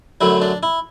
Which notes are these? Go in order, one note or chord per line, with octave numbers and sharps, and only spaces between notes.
F#2 D3 F#3 A3 E4
D4
E4